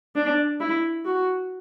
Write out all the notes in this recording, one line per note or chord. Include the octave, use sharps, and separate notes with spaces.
D4
E4
F#4